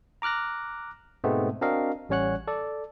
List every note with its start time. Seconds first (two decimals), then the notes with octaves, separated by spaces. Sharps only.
0.22 A#5 D6 F6 F#6 A#6
1.24 G#2 B2 G#3 A3 B3 C4
1.61 C4 D4 F#4 A#4 D#5 F5
2.09 A1 G3 C#4 C#5 F#5 F#6
2.48 A4 D5